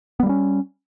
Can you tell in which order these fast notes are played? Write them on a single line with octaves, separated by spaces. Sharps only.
B3 G3 A#3 C#4